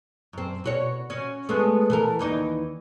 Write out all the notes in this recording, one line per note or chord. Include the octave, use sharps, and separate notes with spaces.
F#2 C4
B2 F#4 C#5
C#4 F#4
G#3 A3 B3
E3 A4 A#4
D#2 E3 D#4